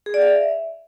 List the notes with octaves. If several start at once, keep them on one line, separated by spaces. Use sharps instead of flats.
G#4
D5
F5
E5